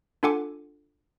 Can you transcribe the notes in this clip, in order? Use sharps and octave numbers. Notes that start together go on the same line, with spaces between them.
D4 F4 A4 F#5 G#5 D6